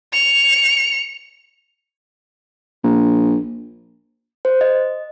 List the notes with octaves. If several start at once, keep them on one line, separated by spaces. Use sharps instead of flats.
C#7 F7
A#1
C5
D#5